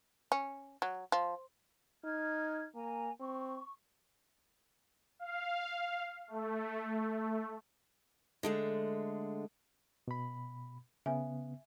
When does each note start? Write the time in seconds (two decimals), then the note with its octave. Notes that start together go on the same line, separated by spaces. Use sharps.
0.32 C#4
0.82 F#3
1.12 F3
2.04 D#4 F6 G#6
2.75 A#3 G#5 A#5
3.20 C4 C#6
5.19 F5
6.28 A3
8.43 D3 G#3 A3
10.08 B2 B5
11.06 C#3 B3 E5 G#5